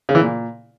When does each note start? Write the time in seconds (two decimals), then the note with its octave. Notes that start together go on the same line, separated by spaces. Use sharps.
0.09 C#3
0.15 E3
0.21 A#2